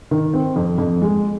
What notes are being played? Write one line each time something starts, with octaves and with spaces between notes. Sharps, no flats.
D#3
C4
F2
F2
G#3